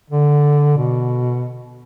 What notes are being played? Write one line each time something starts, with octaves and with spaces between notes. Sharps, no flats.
D3
B2